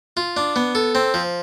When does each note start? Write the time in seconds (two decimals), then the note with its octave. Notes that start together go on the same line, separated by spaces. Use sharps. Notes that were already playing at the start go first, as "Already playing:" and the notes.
0.17 F4
0.37 D4
0.56 B3
0.75 A4
0.95 C4
1.14 F3